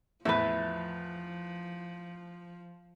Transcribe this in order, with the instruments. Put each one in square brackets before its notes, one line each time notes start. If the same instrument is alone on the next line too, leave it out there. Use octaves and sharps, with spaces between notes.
[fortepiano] E2 A2 [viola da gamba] F3 [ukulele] B4 E5